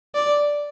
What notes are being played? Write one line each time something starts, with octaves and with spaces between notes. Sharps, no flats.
D5